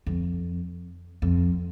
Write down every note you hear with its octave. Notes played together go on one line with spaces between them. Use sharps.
F2
F2